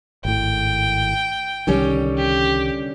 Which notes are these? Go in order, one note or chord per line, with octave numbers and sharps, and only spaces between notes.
G#1 A2 G5
C2 D3 D#3 G3 C#4
G4